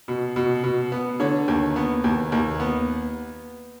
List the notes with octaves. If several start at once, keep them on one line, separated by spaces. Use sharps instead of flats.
B2
B2
B2
B3
D3 C#5
D#2
B3
D#2
D#2
B3